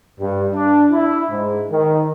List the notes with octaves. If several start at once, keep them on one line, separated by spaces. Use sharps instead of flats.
G2
D4
E4
G#2
D#3